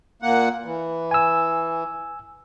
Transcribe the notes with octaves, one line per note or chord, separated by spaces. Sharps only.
A#2 A#3 F#5
E3
G#5 E6